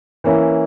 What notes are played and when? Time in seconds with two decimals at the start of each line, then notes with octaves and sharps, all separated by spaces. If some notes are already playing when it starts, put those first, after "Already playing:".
0.24 E3 A#3 C#4 E4